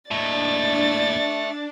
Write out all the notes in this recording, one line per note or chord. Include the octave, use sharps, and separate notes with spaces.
D#2 A2 D4 D5 E5 A5 A6